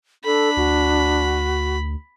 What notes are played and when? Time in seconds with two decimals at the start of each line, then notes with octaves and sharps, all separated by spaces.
0.25 D4 A4 B5
0.57 D2 F#4